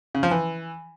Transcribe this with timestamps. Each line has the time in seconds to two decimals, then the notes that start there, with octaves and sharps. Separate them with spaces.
0.15 C#3
0.23 F3
0.31 E3